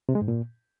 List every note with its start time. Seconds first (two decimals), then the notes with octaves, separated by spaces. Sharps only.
0.09 C3
0.15 G#3
0.22 G#2
0.28 A#2